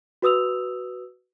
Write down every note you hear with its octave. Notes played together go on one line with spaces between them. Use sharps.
F#4 B4 D#6 E6 F7